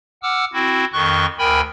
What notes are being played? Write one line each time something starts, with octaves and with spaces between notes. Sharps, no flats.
F#5 D6 E6 F6
C4 E4 F#4
F2 D#3 C6 C#6 F#6
D2 A#4 G5 G#5 B5